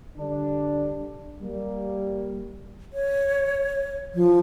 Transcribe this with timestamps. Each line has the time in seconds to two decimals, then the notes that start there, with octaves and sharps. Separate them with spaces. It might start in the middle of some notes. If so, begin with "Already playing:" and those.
0.18 D3 G3 D4
1.41 G3 A#3
2.93 C#5
4.14 F3